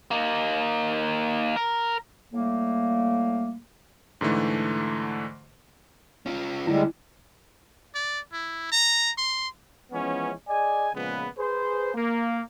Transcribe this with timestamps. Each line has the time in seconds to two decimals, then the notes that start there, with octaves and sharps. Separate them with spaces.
0.11 A#3 D#4
1.56 A#4
2.34 A2 G3 A3 A#3
4.21 G#2 D3 E3 A3
6.26 C#4 F4
6.67 D2 D3 G3 G#3 E4
7.95 D5
8.33 E4
8.72 A#5
9.18 C6
9.92 E3 F3 G#3 B3 C#4
10.47 G#4 D5 D#5 G#5
10.94 A#2 C#3 F3 G#3 B3 B4
11.38 G#4 B4 C5
11.95 A#3